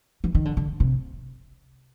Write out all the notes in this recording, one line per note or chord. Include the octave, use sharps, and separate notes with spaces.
E3
D#3
D3
D3
C3